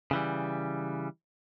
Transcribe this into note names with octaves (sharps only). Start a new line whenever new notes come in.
C#3 E3 G3